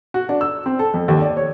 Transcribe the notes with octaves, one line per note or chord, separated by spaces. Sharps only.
F#4
D4
E6
C4
A4
F2
D#2
D5
C#5